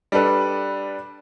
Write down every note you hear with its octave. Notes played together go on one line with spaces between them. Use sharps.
G3 D4 A4 B4